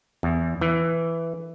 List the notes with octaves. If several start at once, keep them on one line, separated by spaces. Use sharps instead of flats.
E2
E3